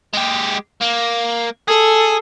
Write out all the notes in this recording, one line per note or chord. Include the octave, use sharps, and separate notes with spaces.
G#3 G4
A#3
G#4 A4